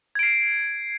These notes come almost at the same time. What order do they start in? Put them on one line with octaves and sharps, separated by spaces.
G#6 D7 C7